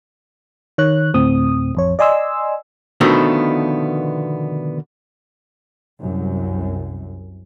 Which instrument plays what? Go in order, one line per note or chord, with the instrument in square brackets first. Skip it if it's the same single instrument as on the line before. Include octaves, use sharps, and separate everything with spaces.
[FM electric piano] D#3 C#5 F#6
D2 A2 C4 D#6
A1 F2 C#5
D5 D#5 G#5 C6 E6
[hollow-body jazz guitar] B2 D3 D#3 F3 A3 B3
[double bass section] C2 F#2